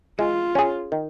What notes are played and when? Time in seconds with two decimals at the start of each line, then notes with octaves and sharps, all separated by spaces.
0.19 G#3 F4
0.55 C#4 G#4
0.92 D#3